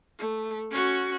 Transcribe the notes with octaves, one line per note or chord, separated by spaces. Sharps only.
A3
C#4 F#4